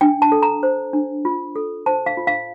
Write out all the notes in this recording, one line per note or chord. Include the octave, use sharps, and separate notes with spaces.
D4 G5
A5
A4
A#5
C5
D4
F4
A4
C5 A5
F5
F4
F5